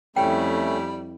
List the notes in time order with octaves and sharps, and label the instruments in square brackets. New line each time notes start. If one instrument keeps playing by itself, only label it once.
[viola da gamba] F2 E4 [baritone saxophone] G3 [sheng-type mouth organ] A3 C#4 [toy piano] G5